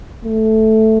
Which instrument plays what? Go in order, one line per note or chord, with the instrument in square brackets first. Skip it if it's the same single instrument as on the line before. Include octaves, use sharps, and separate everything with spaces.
[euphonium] A3